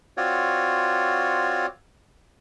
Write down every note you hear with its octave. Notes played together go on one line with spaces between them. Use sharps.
C4 F4 F#4 C#5 D5